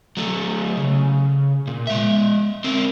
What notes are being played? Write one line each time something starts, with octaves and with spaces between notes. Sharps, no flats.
F#3 A3
C#3
A#2
G#3 E5
C4 A#4